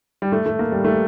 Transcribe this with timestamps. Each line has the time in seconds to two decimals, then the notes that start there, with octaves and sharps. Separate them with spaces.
0.22 G3
0.32 A3
0.46 A3
0.59 A#3
0.72 G3
0.84 A3